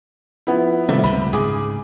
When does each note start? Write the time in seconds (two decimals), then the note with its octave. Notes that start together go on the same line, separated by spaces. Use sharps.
0.47 F3 B3 E4
0.89 G#1 C3 G3 A3
1.04 C#2 C3 B5
1.33 G#2 C#3 G#4 D6